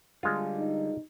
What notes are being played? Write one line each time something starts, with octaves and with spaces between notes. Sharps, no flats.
D3 G3 G#3 F4
D#4